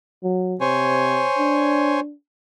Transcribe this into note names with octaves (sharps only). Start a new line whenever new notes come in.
F#3
C3 C5 C#5 G#5
D4